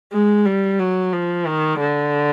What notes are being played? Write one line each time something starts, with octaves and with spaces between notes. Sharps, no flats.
G#3
G3
F#3
F3
D#3
D3